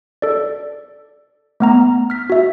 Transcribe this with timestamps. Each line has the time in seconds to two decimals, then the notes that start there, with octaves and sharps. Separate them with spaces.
0.22 A4 D5
1.60 A3 B3 A#5
2.10 F6 B6
2.30 F#4 E5